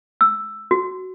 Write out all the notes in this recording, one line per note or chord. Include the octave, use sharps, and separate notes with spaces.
E6
F#4